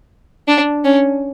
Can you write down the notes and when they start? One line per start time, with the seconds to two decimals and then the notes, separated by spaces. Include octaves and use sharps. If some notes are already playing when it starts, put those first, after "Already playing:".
0.48 D4
0.85 C#4